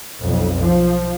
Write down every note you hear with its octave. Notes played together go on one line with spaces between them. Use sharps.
B1 F2
F3